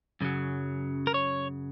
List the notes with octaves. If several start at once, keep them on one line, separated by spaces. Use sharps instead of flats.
F#2 C#3 F#3
A#4
C#5